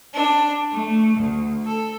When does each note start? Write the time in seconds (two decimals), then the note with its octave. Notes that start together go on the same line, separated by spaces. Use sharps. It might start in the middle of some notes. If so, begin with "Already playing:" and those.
0.15 D4
0.72 A3
1.17 D2
1.65 A4